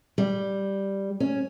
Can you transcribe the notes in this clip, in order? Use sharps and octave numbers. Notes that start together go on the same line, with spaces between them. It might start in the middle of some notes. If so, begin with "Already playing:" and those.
G3
C#4